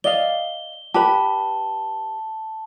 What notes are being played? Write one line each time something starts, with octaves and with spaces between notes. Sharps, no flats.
D5 D#5 F5 G7
G4 B4 A5 B5